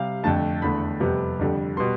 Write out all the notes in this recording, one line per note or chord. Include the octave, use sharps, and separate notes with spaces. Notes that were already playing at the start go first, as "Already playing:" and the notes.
Already playing: C3 G3 F5
F2 D3 A3 A5
E2 D3 A3 B5
F2 C3 G3 B3
F2 D3 G3
B2 G3 B3 C6